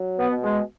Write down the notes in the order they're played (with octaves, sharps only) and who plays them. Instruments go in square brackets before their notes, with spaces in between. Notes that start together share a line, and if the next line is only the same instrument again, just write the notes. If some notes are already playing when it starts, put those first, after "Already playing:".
Already playing: [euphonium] F#3
[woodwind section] B3
[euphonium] B2
[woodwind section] G#3